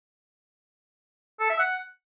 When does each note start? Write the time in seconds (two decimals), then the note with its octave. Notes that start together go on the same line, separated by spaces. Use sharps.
1.40 A4
1.50 E5
1.59 F#5